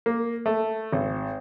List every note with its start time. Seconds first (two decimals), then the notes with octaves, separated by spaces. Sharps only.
0.06 A#3
0.46 A3
0.93 G#1